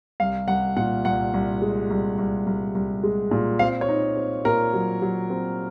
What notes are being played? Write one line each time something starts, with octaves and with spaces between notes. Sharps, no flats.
C2 F5
C2 F#5
A#2 F#5
C2 F#5
C2
G#3
C2
C2
C2
C2
G#3
A#2
C4 F5
C#5
D#4
C4
A#2 A#4
F#3
F#3
C4